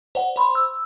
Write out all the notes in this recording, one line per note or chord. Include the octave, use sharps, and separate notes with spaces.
C5 D5 F#5
C5 B5 C6
E6